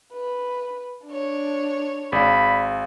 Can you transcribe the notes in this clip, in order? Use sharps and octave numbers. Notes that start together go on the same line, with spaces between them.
B4
D4 C#5
G#1 G#4 D5 F5 B5